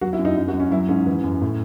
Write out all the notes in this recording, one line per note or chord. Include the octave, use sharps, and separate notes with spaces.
F#3 F#4
E4
F#2
D#4
F#2 D#4
F#4
F#2
C#4
F#3 E4
G#2 C#4
E3
F#2
A2